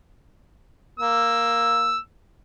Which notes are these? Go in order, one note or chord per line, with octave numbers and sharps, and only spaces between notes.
A#3 E6